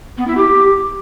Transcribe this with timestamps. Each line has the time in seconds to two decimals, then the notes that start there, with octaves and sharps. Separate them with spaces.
0.18 B3
0.27 E4
0.37 G4